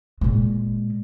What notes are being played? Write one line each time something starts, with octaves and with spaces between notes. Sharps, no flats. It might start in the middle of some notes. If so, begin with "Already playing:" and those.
A#2 G#3